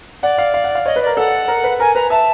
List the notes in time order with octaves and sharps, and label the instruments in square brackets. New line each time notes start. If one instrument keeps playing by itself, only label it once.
[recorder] D5 [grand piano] F#5
[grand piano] F5
F5
F#5
F5
[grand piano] C#5 [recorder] D#5
[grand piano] B4
[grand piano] A#4 [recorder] D5
[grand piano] A4 [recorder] F#5
[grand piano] A#4
B4
[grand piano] A#4 [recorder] G#5
[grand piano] B4 [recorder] A#5
[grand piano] E5 [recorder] A5